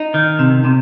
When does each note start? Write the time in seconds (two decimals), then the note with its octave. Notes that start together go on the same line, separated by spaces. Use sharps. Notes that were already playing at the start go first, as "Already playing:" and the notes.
Already playing: D#4
0.14 D#3
0.39 C3
0.65 C3